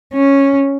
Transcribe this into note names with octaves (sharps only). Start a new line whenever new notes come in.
C#4